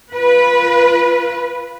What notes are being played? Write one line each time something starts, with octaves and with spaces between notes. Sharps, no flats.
F4 B4